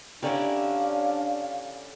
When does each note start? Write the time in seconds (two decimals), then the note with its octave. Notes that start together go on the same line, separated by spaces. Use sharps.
0.23 D3 C#4 D4 E4 G4 A#4 D5 F5